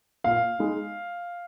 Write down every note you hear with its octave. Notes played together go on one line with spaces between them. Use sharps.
A#2 F5
G#3 D#4